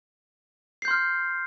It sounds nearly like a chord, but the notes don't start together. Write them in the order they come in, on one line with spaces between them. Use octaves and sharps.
C7 G6 C6 F6